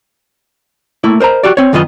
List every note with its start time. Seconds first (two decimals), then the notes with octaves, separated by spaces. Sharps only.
1.04 A3 A#3 E4
1.20 A#4 C5 D#5 A#5
1.43 F#4 G4 D5
1.57 C4 C#5
1.73 F#2 D#3 B3 F4 D#5